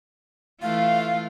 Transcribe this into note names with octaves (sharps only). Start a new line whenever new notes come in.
E3 A3 F4 F5